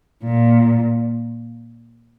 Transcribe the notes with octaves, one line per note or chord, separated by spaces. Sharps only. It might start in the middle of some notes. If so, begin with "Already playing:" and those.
A#2